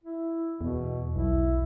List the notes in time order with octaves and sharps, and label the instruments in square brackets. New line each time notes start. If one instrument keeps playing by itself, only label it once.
[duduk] E4
[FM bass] E2 [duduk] B2
[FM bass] B1 [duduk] E4